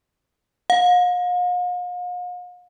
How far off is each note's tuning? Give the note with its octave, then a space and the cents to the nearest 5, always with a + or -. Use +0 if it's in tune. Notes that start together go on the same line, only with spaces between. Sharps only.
F5 +45